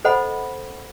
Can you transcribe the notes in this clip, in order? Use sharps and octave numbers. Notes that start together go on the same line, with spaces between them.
A4 C5 D#5 F#5 B5